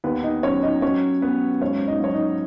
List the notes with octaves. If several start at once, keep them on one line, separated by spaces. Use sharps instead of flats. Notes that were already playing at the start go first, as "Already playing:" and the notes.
D#2 B3 B4
D#4 D#5
F#3 C#4 C#5
D#4 D#5
F#3 C#4 C#5
F#3 B3 B4
G#1 C#4 C#5
D#4 D#5
F#3 C#5
D#4 D#5